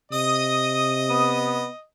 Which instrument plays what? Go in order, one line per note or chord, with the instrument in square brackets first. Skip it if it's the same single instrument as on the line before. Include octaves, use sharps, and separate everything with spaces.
[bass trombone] C3 [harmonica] D#5 [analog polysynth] D#6
[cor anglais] B3